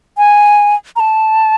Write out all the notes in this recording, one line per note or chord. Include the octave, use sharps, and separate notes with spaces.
G#5
A#5
A5